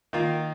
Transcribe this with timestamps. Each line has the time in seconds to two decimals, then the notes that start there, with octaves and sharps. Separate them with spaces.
0.13 D#3 A#3 F4